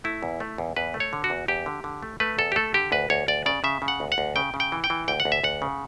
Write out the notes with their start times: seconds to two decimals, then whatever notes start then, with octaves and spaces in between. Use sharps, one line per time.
0.04 A3 E4
0.23 E2
0.40 A3
0.58 E2
0.76 E2 B4
0.94 A3
1.00 C#5
1.13 D3
1.24 F#4
1.30 E2
1.48 E2 G4
1.66 D3
1.84 D3
2.03 A3
2.20 A3 B4
2.38 E2 A4
2.52 G4
2.56 A3 A4
2.74 D3 G4
2.92 D2 B4
3.10 D2 C#5
3.28 D2 D5
3.46 C#3 D5
3.64 C#3 E5
3.82 C#3
3.88 F#5
4.00 D2
4.12 F#5
4.18 D2
4.36 C#3 G5
4.54 C#3
4.60 G5
4.72 E3
4.84 G5
4.90 E3
5.08 D2 G5
5.20 F#5
5.25 D2
5.32 E5
5.44 D2 F#5
5.62 C#3